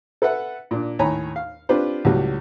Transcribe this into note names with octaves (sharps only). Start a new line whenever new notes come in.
A4 B4 E5 F#5
A#2 D4
D#2 A2 C#5 G#5 A#5 B5
F5
C4 D4 F4 G4 B4 C5
C#2 A2 F#3 G3